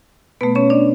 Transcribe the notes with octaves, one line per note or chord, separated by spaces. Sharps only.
B2 A3 B3 B4
C#4 C#5
D4 D5